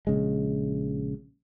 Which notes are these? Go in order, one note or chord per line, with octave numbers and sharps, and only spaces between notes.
A#1 C#3 G#3